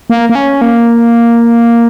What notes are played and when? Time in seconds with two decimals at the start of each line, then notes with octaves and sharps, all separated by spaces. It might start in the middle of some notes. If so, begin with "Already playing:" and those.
0.10 A#3
0.29 A#3
0.35 C#4
0.61 A#3